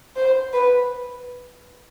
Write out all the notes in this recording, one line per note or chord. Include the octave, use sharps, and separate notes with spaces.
C5
B4